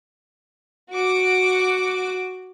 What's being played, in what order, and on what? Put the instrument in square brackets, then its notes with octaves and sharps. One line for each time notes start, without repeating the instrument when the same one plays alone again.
[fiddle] F#4 D6